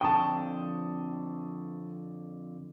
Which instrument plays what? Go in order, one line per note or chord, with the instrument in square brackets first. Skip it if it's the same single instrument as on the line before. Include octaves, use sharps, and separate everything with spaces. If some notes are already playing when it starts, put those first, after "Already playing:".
[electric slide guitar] F2 D3 G5 [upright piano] A5 C#6 D#6